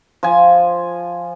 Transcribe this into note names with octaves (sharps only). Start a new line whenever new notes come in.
F3 G#5